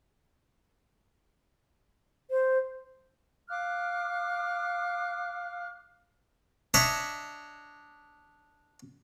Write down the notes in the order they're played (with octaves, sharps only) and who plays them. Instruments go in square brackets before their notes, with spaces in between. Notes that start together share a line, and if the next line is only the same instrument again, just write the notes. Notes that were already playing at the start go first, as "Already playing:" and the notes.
[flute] C5
[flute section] F5 D6 F6 F#6
[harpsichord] D4 C#5 D#5 E5